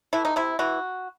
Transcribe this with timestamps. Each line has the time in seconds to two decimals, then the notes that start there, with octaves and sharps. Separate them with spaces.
0.13 E3 A3 E4
0.25 D#4
0.36 C3 E4
0.59 E3 F#4